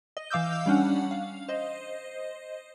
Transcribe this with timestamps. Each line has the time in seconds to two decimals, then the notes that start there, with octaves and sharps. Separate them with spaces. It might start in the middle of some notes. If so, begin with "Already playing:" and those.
0.17 D#5
0.30 E3 F5 D6 E6 G6
0.66 G3 C#4 D4 F#5
1.11 F5
1.49 C5 D#5